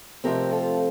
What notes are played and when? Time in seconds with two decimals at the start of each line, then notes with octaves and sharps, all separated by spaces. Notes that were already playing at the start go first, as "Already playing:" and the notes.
0.24 F2 C3 F3 A3 C4 G4 A#4
0.52 F4 A4